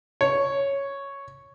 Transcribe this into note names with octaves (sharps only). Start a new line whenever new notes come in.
C#5